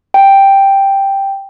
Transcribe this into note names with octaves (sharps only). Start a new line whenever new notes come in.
G5